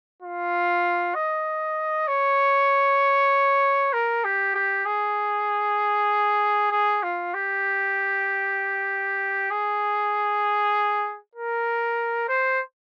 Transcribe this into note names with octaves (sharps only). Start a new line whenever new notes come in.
F4
D#5
C#5
A#4
G4
G4
G#4
G#4
F4
G4
G#4
A#4
C5